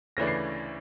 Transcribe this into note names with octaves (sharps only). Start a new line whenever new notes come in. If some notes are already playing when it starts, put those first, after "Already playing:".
D2 C#3 E3 A3 D4 A#6
C7